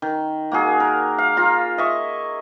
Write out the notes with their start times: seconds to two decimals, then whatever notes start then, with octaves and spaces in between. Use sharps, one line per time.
0.02 D#3
0.52 A#3 F#4 G#4
0.80 A#4
1.18 F5
1.37 F4 A#5
1.78 D#5 E5 C#6